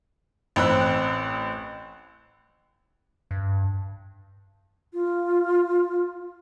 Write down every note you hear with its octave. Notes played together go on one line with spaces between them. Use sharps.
A1 C4 B5 E6 F#6
G2
F4